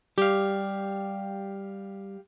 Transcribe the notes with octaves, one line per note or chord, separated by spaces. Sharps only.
G3 G4 F5